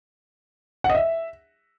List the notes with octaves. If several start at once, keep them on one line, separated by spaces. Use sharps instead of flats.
F#5
D#5
E5